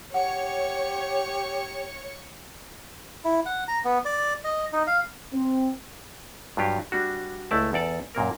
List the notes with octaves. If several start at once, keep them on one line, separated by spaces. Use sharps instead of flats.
G4 C#5 F#5 C#6
E4
F#5
A#5
B3
D5
D#5
D#4
F5
C4
G2 F#3 F4 G4
G3 D4 F#4
C#2 A3 E4 D5 E5 A5
E2 A4 D5 A5
F#2 A#2 A#3 A#4